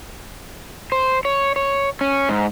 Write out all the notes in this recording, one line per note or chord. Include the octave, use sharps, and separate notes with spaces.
C5
C#5
C#5
C#4
G#2